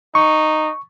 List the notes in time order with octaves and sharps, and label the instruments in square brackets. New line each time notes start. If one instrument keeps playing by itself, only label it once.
[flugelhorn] D#4 [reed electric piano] C#6